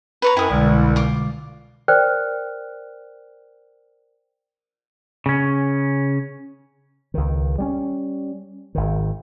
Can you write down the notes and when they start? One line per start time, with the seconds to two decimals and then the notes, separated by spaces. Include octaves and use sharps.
0.22 B4 C#5 A#5
0.37 F#2 E4 G5 D#6
0.50 C2 B2 D3 G#3
0.96 F4 D6
1.88 A#4 C5 D5 G5 F6 F#6
5.26 C#3 C#4
7.14 C#2 D#3
7.58 G3 A3 C#4
8.75 G#1 D#3